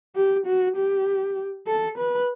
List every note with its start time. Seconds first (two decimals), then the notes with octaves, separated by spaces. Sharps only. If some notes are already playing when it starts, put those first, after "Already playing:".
0.16 G4
0.46 F#4
0.76 G4
1.67 A4
1.98 B4